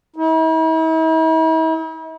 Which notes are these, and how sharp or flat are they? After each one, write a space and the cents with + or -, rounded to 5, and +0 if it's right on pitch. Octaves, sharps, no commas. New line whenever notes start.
E4 -45